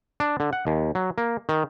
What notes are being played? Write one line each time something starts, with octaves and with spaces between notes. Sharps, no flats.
D4
D3
F#5
D#2
F#3
A#3
D#3